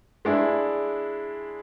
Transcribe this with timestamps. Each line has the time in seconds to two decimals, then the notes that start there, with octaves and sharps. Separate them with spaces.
0.25 G#3 D4 E4